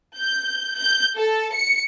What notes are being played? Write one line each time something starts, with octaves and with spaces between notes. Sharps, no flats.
G6
G6
A4
C#7